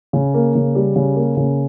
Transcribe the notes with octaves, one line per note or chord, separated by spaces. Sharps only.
C#3
A#3
C#3
G3
C#3
A#3
C#3